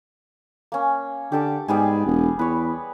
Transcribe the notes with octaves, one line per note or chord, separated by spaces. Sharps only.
A#3 C#4
D3 G4 A4 D6
G#2 G3 B3 G#4
E1
E2 B4 C#5